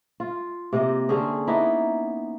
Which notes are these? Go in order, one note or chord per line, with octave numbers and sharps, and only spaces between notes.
F4
C3 A#3 C4 D#5
D3 C4 C#4 G#4
A#3 B3 D#4 E4